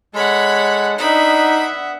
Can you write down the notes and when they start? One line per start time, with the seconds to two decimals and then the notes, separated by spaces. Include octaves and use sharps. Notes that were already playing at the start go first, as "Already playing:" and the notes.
0.14 G#3 A4 C#5 F#5 B5
0.98 B3 D4 D#4 E5 F#5 B5